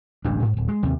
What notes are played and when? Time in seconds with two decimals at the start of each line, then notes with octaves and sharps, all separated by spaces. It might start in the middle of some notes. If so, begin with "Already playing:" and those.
0.24 D1 A1 G2 D4
0.42 G#2
0.57 D1
0.68 G#3
0.83 D#2 C3